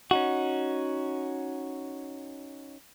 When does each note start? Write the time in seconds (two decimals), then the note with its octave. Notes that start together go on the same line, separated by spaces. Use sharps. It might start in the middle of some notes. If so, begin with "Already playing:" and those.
0.11 C#4 D#4 F#4